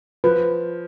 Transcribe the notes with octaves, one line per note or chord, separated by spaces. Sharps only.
F3 B4